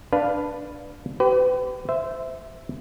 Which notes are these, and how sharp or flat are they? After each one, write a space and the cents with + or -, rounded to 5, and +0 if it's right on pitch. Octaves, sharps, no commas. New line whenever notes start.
D4 +0 B4 +0 F5 +0
G4 -30 B4 +35
C5 -25 E5 +0